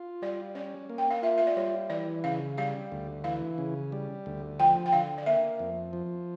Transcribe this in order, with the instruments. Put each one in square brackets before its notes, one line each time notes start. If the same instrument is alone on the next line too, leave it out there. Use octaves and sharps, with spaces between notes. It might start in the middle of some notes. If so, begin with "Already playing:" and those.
Already playing: [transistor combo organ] F4
[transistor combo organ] G3 [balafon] D5
[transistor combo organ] C#4 [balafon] D5
[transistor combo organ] A#3
[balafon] G5
F5
[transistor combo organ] F4 [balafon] E5
[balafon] E5
D5
[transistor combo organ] G3 [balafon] C#5
[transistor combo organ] E3 [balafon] D5
[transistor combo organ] C#3 [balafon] F5
[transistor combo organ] G3 [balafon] F5
[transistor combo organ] D2
[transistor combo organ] E3 [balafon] F5
[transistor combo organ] C#3
G3
D2
[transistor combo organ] F3 [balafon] G5
[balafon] G5
[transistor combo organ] D3 [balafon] F5
[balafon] D5
[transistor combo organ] A#3 [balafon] E5
[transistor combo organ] F2
F3